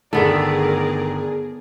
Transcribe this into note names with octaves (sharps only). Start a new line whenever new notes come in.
G1 D#3 A3 B3 G#4 A#4 D5 E5